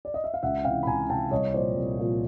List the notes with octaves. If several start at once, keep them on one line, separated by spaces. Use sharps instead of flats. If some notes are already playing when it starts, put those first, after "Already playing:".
D5
D#5
E5
F5
C#2 E5 F#5
C3 E3 F5 G5
B5
C#2 G#5 A#5
C3 E3 G5 A5
C2 C#5 D#5
A#2 F3 C5 D5
C2
A#2 F3